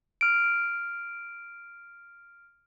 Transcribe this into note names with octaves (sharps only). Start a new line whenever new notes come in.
F6 D7